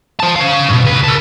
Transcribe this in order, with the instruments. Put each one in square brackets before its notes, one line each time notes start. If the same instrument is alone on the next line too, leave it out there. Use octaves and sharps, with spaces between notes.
[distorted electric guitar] C5 A5
C#4 F5
G2 B2
C#2 B4
A#4 A5